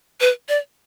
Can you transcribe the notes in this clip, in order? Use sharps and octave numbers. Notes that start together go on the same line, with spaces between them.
B4
D5